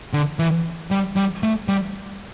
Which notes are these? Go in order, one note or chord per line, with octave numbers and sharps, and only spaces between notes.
D3
E3
G3
G3
A3
G3